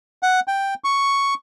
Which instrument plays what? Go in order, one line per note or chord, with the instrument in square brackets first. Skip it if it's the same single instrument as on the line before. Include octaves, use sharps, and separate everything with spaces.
[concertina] F#5
G5
C#6